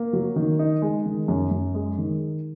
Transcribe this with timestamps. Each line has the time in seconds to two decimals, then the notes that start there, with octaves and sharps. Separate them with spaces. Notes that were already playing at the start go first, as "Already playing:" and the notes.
Already playing: A#3
0.13 F#3
0.36 D#3
0.59 D#4
0.82 G#3
1.06 D#3
1.28 F#2
1.51 F#2
1.74 G#3
1.98 D#3